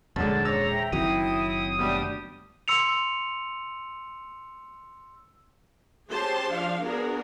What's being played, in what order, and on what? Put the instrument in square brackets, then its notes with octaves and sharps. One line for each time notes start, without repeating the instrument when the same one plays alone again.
[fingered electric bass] D#1 G#3 [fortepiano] F#2 D3 [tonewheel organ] A5
[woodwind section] C5 C#5 [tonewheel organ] A#5 [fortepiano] D6 E6
[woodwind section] E5 G5
[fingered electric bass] F#1 D#3 F#3 [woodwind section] C4 E4 [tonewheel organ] D#6
[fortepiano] B2 G3 D4 [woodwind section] A3 G4
[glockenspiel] C6 E6 C#7 F7
[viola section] C#4 G4 G#4 C5 A5 C6
F3 D4 F5
B3 D4 F#4 G#4 A#4